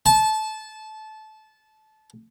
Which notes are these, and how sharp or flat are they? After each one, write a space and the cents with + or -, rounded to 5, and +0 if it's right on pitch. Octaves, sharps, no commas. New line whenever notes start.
A5 -20